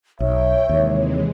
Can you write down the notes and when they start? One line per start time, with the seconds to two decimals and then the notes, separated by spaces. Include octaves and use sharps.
0.20 B1 C#5 E5 G5
0.69 D#2 C3 E3 G#3